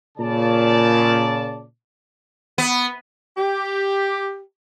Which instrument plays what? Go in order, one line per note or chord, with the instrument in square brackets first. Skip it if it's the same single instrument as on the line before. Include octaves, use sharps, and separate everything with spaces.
[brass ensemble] A#2 C#3 D5 A5
[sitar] B3
[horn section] G4